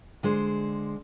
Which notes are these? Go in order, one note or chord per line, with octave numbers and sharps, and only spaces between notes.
D3 G#3 C5